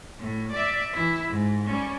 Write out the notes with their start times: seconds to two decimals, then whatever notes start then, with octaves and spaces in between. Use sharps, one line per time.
0.19 A2
0.52 D5 E5
0.93 E3 E4
1.28 G#2
1.66 G3 C#4